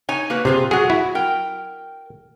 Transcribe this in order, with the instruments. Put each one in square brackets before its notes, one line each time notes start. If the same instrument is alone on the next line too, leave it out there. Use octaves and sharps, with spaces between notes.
[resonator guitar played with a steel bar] D#4 C#5 G#5
A#3 F#4 B4
[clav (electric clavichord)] C3 [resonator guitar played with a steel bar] C4 F4 G#4
[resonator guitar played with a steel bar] F#3 F#4 [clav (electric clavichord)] G#4
[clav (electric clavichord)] E4
[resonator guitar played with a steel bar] A#4 G5